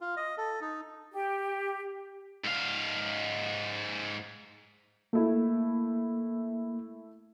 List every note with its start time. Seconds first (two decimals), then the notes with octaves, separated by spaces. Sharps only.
0.01 F4
0.17 D#5
0.38 A4
0.61 D#4
1.12 G4
2.44 G#2 F5
5.13 A3 A#3 E4